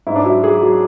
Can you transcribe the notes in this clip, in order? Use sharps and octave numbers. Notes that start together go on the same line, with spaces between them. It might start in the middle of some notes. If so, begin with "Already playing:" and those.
G#2 E4
D4
F#3 E4
F#3 G#4
F#3